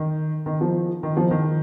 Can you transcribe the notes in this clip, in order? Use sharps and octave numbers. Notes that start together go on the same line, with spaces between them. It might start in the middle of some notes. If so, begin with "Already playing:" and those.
Already playing: D#3
D#3
F3
D#3
F3
D#3